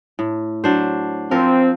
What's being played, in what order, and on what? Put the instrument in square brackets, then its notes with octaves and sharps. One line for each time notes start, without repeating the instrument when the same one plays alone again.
[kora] A2
F#3 D4 C5
[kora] F3 A#4 [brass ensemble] C4